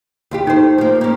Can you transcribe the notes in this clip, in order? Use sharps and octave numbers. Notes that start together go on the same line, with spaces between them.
D#2 F4 G4
A3 D#4 C5
F3 A#3
A#3 C#4